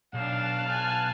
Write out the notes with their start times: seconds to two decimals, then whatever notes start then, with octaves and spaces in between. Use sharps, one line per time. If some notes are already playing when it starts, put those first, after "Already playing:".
0.15 B1 D4 F5 A5 F6 F#6 E7
0.68 G#5